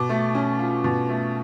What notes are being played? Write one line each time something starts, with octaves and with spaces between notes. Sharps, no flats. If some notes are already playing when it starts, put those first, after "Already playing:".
Already playing: B2 D6
A3
C#4
F4
B2
A3